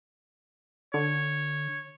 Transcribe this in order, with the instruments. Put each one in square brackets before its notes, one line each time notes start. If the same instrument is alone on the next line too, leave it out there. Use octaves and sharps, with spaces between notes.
[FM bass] D3 [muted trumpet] C#5